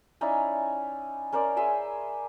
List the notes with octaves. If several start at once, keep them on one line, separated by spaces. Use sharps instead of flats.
C#4 D#4 E4 D5
C#4 A#4 C5 D5
G#4 E5 G#5 C6